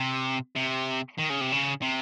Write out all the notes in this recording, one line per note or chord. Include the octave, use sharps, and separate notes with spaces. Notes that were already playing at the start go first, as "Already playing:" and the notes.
Already playing: C3
C3
D#3
C#3
C3
C#3
C3